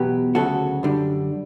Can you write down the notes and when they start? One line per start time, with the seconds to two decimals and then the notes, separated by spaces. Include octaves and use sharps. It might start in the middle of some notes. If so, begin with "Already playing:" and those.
Already playing: E2 B2 F#3 G4 B4
0.35 D2 C#3 F#3 F#4 A4
0.83 F#2 D3 G3